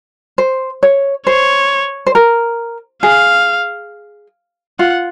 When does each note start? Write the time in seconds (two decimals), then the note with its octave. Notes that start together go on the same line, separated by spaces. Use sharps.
0.38 C5
0.83 C#5
1.26 C5 C#5
2.07 C5
2.15 A#4
3.03 G#4 F5
4.79 F4 F#5